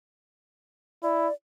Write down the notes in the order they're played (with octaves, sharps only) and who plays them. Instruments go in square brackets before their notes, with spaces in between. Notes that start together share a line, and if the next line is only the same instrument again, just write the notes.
[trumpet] E4 [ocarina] D5